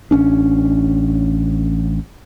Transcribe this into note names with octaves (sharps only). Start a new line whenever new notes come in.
A1 C#4 D4